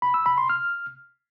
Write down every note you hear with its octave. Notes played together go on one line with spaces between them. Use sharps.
B5
E6
B5
C6
F6